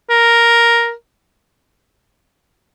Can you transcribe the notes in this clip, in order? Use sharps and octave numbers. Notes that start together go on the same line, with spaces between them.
A#4